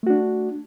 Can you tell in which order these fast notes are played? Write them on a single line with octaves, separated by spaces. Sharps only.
A3 F#4 D4